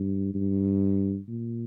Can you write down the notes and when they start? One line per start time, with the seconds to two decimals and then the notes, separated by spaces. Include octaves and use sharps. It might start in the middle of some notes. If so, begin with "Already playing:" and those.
Already playing: G2
0.34 G2
1.27 A#2